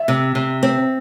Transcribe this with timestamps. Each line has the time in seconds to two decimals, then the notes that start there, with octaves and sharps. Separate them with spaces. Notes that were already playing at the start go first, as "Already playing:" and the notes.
Already playing: E5
0.08 C3
0.35 C3
0.63 C4